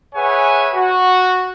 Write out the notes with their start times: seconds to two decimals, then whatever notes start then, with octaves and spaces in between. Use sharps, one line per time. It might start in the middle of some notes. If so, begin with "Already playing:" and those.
0.15 G#4 B4 C#5 E5 F#5 G#5
0.75 F#4